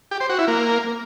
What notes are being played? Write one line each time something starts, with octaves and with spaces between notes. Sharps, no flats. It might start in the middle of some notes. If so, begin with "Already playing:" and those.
G4
C5
F#4
E4
A#3